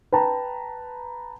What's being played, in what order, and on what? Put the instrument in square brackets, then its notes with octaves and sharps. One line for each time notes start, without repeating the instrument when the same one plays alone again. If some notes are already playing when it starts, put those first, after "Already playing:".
[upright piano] B4 G5 A5 A#5